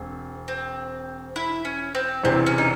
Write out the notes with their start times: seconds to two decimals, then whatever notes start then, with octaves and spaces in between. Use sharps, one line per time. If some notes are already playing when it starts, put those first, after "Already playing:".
Already playing: E1 C4
0.48 C4
1.36 E4
1.65 C#4
1.95 C4
2.24 E1 E2 C3 E3 C4
2.46 C#4
2.58 D#4